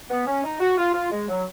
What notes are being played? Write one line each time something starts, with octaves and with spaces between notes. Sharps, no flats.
B3
C#4
D#4
F#4
F4
F4
G#3
F#3